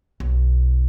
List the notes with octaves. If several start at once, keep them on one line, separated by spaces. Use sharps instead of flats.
B1